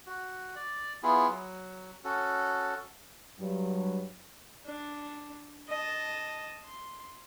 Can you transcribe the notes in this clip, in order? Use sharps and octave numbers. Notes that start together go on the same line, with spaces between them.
F#4
D5
B3 E4 F4 G#4
F#3
C#4 F#4 A4
G2 F#3
D4
D#5 A5
C6